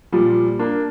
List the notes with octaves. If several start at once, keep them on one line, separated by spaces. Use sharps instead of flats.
A#2 F3 G3
A#3 D4